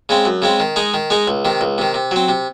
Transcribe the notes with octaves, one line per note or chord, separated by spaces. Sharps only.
C#3 G#3 C4
F#2
C#3 G#3 C4
D#3
G#3 D#4 G#4
D#3
G#3 D#4 G#4
C#2
C3 D#3
C#2
C3 D#3
C3
F#3 C4
C3